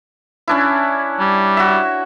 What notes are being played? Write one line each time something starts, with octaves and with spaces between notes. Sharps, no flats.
C#4 D4 E4
G3
F#4 E5